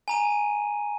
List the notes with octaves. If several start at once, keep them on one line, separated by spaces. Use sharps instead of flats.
G#5 A#5 D#7